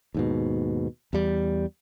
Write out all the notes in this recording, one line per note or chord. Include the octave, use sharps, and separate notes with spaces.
D#2 G#2 B2
E2 G3